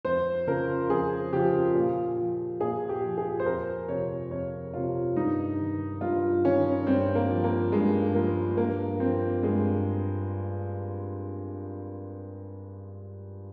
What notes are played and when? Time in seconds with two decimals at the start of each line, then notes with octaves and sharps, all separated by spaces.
0.05 F2 C5
0.47 C#3 F3 A#4
0.90 F2 G#4
1.33 C#3 F3 G4
1.75 A#2
2.18 F3
2.60 A#2 G#4
2.89 G4
3.03 F3
3.18 G#4
3.39 C5
3.46 F2 A#4
3.88 C3 F3 C#5
4.31 F2 C#5
4.74 C3 F3 F4
5.16 G2 D#4
5.60 D#3
6.01 G2 F4
6.44 D#3 C#4
6.87 G2 C4
7.15 A#3
7.30 F3
7.44 A#3
7.72 G2 G#3
8.15 F3 A#3
8.57 G2 A#3
9.00 F3 C4
9.43 G2 G#3